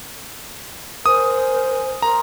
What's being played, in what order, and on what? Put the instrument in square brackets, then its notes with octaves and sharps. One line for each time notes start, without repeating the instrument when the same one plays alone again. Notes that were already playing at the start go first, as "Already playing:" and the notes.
[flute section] A#4 C5 G#5 [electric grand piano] D#6
[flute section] A#4 C6 [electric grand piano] A#5